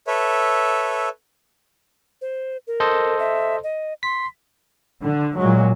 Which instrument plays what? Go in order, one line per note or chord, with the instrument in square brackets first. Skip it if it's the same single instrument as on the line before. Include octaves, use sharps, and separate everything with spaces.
[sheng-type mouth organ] A4 B4 C#5 E5
[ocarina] C5
A#4
[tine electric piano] A4 C5 D#5
[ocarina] E5
D#5
[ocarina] C6 [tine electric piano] B6
[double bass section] D3
A#2 F#3 G#3